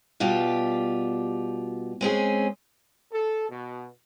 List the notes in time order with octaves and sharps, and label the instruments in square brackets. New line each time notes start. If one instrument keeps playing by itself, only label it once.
[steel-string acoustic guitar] B2 G3 F4 G4
G#3 C4 C#4 G#4
[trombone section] A4
B2